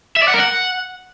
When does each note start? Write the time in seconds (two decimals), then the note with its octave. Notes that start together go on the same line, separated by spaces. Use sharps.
0.17 E5
0.22 D5
0.28 F#5
0.34 A#4
0.40 F#5